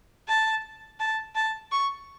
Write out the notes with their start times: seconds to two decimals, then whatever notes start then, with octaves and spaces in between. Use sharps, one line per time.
0.28 A5
1.00 A5
1.35 A5
1.71 C#6